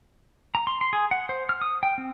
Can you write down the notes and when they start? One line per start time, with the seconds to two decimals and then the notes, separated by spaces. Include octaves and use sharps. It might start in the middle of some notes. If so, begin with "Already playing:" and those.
0.55 A#5
0.67 C6
0.81 C6
0.93 G#4
1.11 F#5
1.29 C5
1.49 F6
1.61 D#6
1.83 G5
1.98 C4